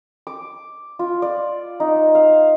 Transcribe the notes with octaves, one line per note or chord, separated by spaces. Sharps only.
D6
F4
D5
D#4
F5